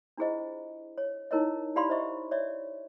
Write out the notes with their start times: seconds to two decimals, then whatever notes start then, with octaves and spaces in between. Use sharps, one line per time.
0.17 D4 E4 F4 G#4 C5 D#5
0.98 C#5
1.31 D#4 E4 A#4 C#5 D#5
1.76 E4 G4 D5 F5 B5 C6
1.89 C5 D#5 E5 C#6
2.31 C#5 D5 E5